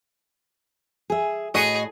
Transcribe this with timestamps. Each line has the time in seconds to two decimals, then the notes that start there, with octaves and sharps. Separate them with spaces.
1.10 G#4 E5
1.54 A2 F#4 G#4 D#5